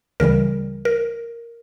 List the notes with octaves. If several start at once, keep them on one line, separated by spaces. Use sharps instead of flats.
D2 C#3 E3 G3 A#4
A#4